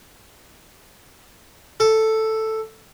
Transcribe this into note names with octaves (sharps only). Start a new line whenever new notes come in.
A4